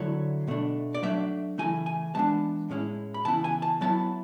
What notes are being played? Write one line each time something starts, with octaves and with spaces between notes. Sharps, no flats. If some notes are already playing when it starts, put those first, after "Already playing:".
Already playing: D3 F#3 A3 E4 C#5
B2 A3 D4
D5
F#3 A3 D4 E5
C#3 E3 A3 E4 G#5
G#5
E3 G#3 B3 D4 A5
A2 G#3 C#4 E4
B5
C#3 E3 B3 E4 A5
G#5
A5
F#3 B3 E4 A5